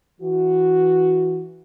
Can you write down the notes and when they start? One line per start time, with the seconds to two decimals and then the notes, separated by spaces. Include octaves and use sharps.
0.21 E3 F#4